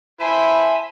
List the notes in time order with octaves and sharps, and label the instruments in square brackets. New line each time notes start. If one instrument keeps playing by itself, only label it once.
[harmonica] E4 C5 [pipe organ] E5 G#5 A5 [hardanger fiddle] B5